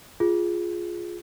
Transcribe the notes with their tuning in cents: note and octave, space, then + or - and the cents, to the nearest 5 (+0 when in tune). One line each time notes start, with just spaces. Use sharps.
F4 +0 G#4 +0